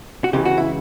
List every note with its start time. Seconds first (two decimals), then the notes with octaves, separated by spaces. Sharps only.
0.24 F#4
0.33 C#2 C#3 E3 G4
0.45 F#4
0.58 E4